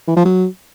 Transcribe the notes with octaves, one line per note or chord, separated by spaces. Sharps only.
E3
F3
F#3